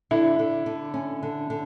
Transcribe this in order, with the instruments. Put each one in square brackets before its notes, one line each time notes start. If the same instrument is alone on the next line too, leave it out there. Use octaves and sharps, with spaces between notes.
[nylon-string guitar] D3 [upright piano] E4
[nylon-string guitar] D3
D3
C#4
D3
D3